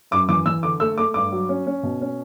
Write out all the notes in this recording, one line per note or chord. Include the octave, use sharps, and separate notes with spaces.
F#2 D6
E3 D6
E3 E6
D3 D6
A3 E6
A3 D6
G2 D6
F#3
C#4
C#4
B2
C#4